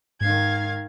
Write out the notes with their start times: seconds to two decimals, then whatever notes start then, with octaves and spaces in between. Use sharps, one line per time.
0.21 G#2 D#3 F5 G#6